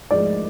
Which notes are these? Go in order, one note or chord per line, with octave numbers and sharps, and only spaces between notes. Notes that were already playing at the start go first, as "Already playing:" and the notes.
G#2 F3 G#3 D5